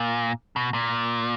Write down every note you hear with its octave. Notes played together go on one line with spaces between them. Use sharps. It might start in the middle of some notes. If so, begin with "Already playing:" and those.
Already playing: A#2
B2
A#2